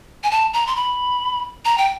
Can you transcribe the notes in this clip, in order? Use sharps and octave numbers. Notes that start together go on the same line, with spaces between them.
G#5
A5
A#5
C6
B5
A#5
G5